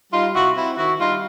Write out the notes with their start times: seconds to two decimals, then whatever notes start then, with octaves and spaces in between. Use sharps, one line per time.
0.12 G3 D#4 F4
0.34 C3 E4 F#4
0.56 C4 E4
0.77 D#3 E4 F#4
0.99 G3 D#4 F4